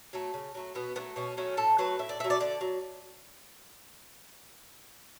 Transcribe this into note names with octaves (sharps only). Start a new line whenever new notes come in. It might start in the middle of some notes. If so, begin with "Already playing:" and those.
F#3 A3
C#3
F#3 A3
B2 B3
F#3 A3 B3
B2 C#4
F#3 A3 C#4
A2 A4
F#3 A3 B4
A2 E5
D5
F#3 A3 E5
D5
D3 D5
F#3